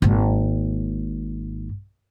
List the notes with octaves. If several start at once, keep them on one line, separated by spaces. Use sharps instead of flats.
G#1 A#3